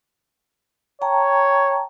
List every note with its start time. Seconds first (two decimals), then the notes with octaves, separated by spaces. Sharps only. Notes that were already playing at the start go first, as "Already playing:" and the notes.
1.02 C#5 G5 A5 A#5